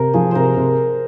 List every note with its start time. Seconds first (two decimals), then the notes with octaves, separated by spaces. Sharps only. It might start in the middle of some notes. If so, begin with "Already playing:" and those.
Already playing: C3 A#4 C5
0.14 F3 G#4
0.31 C3 A#4 C5
0.57 C3